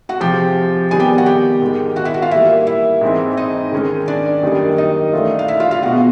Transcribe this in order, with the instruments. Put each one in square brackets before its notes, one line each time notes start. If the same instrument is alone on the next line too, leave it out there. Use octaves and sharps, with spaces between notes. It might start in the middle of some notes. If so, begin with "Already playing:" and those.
[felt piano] F#4 F#5
[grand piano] C3 F3 G#3 [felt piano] G4 G5
[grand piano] D#3 G3 B3 [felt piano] G#4 G#5
[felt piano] G4 G5
F#4 F#5
G4 G5
[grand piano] G#2 D#3 G#3
[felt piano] F#4 F#5
E4 E5
F#4 F#5
F4 F5
[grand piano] E3 G3 A#3 [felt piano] E4 E5
[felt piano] E4 E5
[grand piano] G#2 E3 G#3 C4 D#4
[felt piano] D#4 D#5
[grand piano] D#3 G#3 C#4
[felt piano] D4 D5
[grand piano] F#2 D#3 G3 A#3 D#4
[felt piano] D#4 D#5
[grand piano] E3 A3 D4 F4
[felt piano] F5
E4 E5
F4 F5
F4 F5
[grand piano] B2 G#3 B3 [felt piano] F#4 F#5